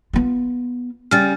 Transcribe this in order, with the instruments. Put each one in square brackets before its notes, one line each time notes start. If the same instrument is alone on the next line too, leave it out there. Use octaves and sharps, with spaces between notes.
[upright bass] B3 F4
[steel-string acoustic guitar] C#3 G3 [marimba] F6 A6